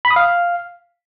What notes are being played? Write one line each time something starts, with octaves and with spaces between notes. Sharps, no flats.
B5
D#6
F5